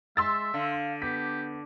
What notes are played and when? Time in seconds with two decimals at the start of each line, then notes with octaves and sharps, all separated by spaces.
0.17 G#3 E5 C6 E6 A6
0.54 D3 F5
1.02 B3 G4 B6